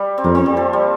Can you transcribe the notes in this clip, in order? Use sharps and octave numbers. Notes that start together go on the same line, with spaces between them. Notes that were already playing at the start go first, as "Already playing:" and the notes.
Already playing: G3
C4
F2 A#3
C4
G3
F3
G3